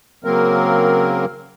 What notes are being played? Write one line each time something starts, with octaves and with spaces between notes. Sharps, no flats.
C#3 F#3 A#3 C4 A#4